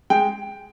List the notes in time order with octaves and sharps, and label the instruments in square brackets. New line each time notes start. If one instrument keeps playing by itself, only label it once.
[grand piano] G#3 G5